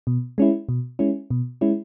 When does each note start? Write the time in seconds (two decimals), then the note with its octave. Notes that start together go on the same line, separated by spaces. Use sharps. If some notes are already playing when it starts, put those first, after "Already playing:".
0.07 B2
0.38 G#3 C#4 E4
0.69 B2
0.99 G#3 C#4 E4
1.30 B2
1.61 G#3 C#4 E4